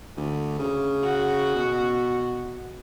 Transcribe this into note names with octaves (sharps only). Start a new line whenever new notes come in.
D2
C#3
F#4
B2